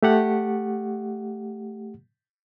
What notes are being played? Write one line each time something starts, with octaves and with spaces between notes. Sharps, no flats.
A3 G4 F#5